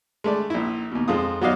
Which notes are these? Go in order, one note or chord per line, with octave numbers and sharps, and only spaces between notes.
G#3 A3 D5
A#1 E4
D#2 B2
F2 G#3 F4 D#6
F#3 B3 F#4 D5 D#5 F5